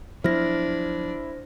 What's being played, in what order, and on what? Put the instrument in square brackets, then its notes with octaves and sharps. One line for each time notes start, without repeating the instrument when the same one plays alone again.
[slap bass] F3 F#3 B3 [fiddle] D4 [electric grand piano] E4 F6 [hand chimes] C5 A#6